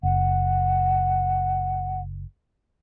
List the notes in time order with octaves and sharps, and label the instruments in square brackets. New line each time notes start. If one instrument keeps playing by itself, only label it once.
[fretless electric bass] F#1 [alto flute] F#5